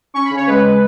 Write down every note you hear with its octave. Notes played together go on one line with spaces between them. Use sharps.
C#4 C#6
B5
C#3
C#5
G#3 B4